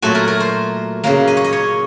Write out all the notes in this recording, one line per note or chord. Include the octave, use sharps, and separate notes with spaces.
A#2 F#3 A3 F#4
A#4
A#4
C5
C#3 F#3 A#3
D#5
C#5
D#5
C#5